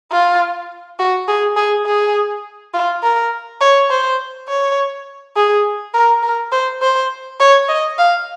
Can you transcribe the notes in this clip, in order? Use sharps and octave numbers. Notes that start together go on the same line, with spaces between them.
F4
F#4
G#4
G#4
G#4
F4
A#4
C#5
C5
C#5
G#4
A#4
A#4
C5
C5
C#5
D#5
F5